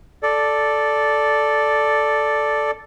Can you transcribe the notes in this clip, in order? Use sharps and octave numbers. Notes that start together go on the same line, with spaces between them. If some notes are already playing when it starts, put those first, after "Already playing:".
A4 D5